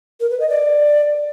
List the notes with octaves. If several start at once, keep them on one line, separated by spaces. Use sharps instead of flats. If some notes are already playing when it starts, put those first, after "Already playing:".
A#4
B4
D#5
D5